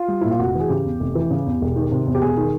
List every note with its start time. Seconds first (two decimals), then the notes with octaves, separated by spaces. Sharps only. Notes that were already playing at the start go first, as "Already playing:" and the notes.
Already playing: F4
0.08 G3
0.21 A#2 E4
0.31 F4
0.39 F1 F#4
0.55 E3
0.60 G#4
0.69 C#3 G4
0.85 E2
1.00 F1
1.15 E3
1.31 C#3
1.46 E2
1.62 E1
1.76 D#3
1.92 C3
2.07 E2
2.15 G4
2.22 E1 G#4
2.37 D#3